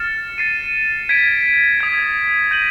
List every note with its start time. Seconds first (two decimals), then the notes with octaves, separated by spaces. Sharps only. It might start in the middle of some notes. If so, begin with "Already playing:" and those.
Already playing: F6 A6 C#7 E7
0.38 A6 C7 D#7
1.09 G#6 B6 D7
1.80 D#6 G#6 B6
2.51 G6 A#6 D#7 F#7